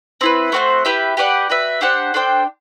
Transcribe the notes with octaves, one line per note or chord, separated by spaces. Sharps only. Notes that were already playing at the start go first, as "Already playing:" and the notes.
C4 E4 B4
A3 C4 F#4 C5
E4 G4 B4 E5
G4 B4 D5 F#5
F#4 B4 E5
D4 G4 C5 F#5
D4 A4 C5 G5